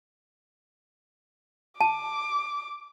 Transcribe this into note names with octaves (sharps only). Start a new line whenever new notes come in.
A5 D6